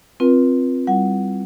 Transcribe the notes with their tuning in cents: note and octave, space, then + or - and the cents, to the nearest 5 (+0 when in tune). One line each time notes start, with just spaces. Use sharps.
C4 +0 F4 +0 B4 -40
G3 +0 E4 +0 F#5 +0